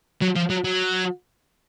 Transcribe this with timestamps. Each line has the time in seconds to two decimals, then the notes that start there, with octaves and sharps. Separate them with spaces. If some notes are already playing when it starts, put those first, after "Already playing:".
0.22 F#3
0.36 F3
0.50 F#3
0.64 F#3